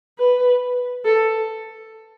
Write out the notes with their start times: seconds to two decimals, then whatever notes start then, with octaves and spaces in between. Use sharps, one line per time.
0.19 B4
1.05 A4